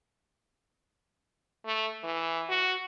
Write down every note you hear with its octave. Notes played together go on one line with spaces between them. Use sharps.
A3
E3
F#4